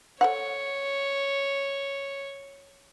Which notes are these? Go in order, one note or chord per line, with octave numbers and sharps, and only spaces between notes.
A4 C5 C#5 F#5